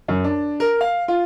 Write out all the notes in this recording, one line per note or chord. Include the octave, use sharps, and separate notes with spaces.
F#2
D4
A#4
F5
F4